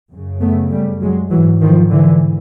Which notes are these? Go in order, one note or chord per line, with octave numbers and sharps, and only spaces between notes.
F#2 C#3
A3 B3
G3 A3
F#3 G#3
G#2 E3 F#3
D#3 F3
D3 E3